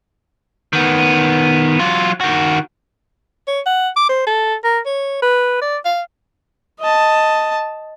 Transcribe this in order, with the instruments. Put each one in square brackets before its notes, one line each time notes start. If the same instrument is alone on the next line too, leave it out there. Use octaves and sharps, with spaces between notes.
[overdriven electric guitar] D#3 B3
F#3 F4
D#3 F#4
[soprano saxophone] C#5
F#5
D6
C5
A4
A#4
C#5
B4
D5
F5
[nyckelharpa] D#5 A5